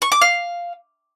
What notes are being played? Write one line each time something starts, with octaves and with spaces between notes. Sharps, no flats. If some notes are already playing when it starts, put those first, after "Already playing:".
C#6
D6
F5